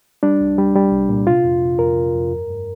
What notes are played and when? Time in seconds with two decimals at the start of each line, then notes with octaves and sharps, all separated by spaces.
0.23 G3 D4
0.41 C2
0.58 G3
0.75 G3
0.92 C2
1.09 A#2
1.27 C3 F4
1.44 F2
1.62 C3
1.79 F2 A#4
1.97 C3
2.14 F2
2.31 G2
2.49 G2